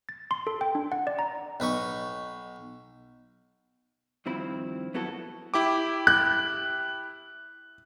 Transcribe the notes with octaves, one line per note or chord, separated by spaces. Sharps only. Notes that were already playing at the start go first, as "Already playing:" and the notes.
A6
C6
A4
G5
D4
F#5
D5
A#5
B1 B4 D#5 C#6
G2 D#3 F3 C4 E4 B5
F#2 B3 E4 F#4 A4
E4 G4 D6
F#6